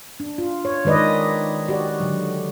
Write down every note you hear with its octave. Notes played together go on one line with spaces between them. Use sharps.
D4
F4
C#5
D#3 G#3 B4 D5 D#5
F#4 G4 D5
D3 F#3